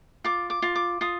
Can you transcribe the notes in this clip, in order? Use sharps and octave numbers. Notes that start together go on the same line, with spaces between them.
F4 D6
D6
F4
D6
F4 D#6